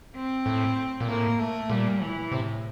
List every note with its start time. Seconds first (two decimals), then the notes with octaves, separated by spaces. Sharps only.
0.16 C4
0.46 A2
1.00 A#2
1.08 A2 A#3
1.39 A3
1.70 A#2 G3
2.01 E3
2.31 A2 C3